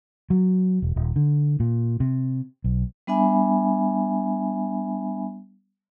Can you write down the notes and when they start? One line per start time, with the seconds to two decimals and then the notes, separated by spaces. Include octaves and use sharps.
0.30 F#3
0.82 E1
0.96 D#1
1.16 D3
1.60 A#2
2.00 C3
2.64 B1
3.07 G3 B3 D4 E5 G#5 B5